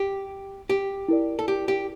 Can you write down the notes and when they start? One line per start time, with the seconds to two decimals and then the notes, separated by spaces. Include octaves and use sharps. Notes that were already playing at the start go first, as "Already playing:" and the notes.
Already playing: G4
0.70 G4
1.08 E4 A#4 D5
1.39 A4
1.48 G4
1.68 G4